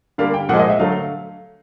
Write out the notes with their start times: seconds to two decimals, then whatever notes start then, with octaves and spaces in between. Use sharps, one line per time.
0.18 D3 G3 A#3 F5
0.34 G5
0.49 A#2 F3 G#3 F#5
0.59 D#5
0.70 E5
0.79 D3 F#3 A3 F5